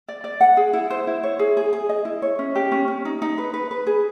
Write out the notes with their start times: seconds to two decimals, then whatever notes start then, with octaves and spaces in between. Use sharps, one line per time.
0.08 D5
0.24 D5
0.41 F#5
0.57 G#4
0.73 E4
0.90 C5
1.07 E4
1.23 C#5
1.39 G#4
1.57 G#4
1.73 G#4
1.89 D#5
2.05 E4
2.22 C#5
2.39 C#4
2.56 G4
2.72 C#4
2.88 C#4
3.05 D#4
3.22 D#4
3.38 B4
3.54 B4
3.71 B4
3.87 G#4